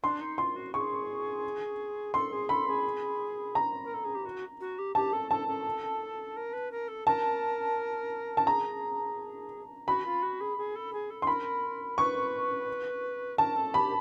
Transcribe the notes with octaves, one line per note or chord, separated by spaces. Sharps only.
D4 C6
D#4
F4 C6
F#4
G#4 C#6
A4 C6
G#4
A4 B5
G#4
A#5
A#4
A4
G#4
G4
F#4
F#4
G4
G4 A5
A4
A4 A5
A4
A#4
B4
A#4
A4
A#4 A5
A5
G#4 A#5
F#4 B5
F4
F#4
G#4
G#4
A4
G#4
A4
C6
A#4 B5
B4 C#6
A#4 A5
A4
G4 B5